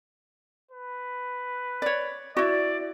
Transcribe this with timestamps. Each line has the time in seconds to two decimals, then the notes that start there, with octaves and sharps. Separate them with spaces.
0.71 B4
1.82 C#5 D5
2.37 E4 F#4 D5